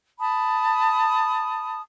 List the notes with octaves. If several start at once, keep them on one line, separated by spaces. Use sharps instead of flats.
A5 B5 D#6